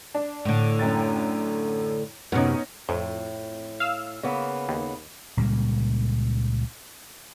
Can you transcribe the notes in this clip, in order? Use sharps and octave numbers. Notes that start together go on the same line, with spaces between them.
D4
A2 D3
F#2 G5 A6
F#2 C3 B3 C#4 D#4
F2 A2
F5 E6
C#3 A#3 B3
D#2
C#2 A#2 G3 A#3